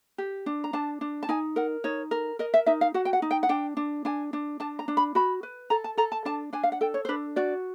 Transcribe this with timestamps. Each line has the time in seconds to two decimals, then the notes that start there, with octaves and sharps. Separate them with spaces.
0.18 G4
0.46 D4
0.64 A#5
0.73 D4 A5
1.01 D4
1.23 A5
1.29 D#4 G#5
1.56 A#4 F#5
1.84 D#4 C#5
2.11 A#4
2.39 A#4 D#5
2.54 E5
2.66 D#4 E5
2.81 F5
2.94 F#4 F#5
3.05 G5
3.13 F#5
3.22 D#4
3.31 G5
3.43 F#5
3.49 D4 G5
3.77 D4
4.05 D4 G#5
4.33 D4
4.60 D4 A5
4.79 A#5
4.88 D4
4.97 B5
5.15 F#4 B5
5.43 B4
5.70 A4 A#5
5.84 A5
5.97 A4 A#5
6.12 A5
6.25 D4 A5
6.53 D4 G#5
6.63 F5
6.72 F#5
6.81 A4 G5
6.94 C#5
7.05 C5
7.09 D4 B4
7.36 F#4 D5